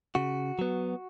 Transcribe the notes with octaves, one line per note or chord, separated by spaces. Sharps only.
C#3 F#4
F#3 B3